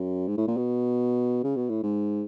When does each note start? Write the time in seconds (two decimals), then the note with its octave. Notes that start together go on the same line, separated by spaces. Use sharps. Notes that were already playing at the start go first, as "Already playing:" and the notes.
Already playing: F#2
0.28 G#2
0.37 A2
0.47 A#2
0.57 B2
1.43 C#3
1.56 B2
1.69 A2
1.83 G#2